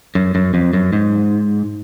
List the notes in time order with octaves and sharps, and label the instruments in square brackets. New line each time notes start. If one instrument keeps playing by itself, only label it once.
[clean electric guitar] F#2
F#2
F2
F#2
G#2